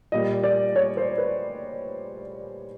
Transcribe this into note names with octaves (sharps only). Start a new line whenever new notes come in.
A#2 G3 A#3 D#5
D5
C#5
C5
B4